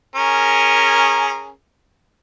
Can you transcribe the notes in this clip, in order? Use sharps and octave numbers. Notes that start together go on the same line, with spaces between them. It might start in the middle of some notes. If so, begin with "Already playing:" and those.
C#4 G#4 A#4